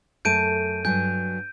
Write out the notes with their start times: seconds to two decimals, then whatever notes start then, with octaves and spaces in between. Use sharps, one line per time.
0.25 F#2 A3 A5 G6 D7 D#7
0.85 G2 F#3 G#5 G6